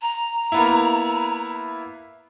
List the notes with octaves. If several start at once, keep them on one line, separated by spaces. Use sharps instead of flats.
A#5
A#3 B3 E4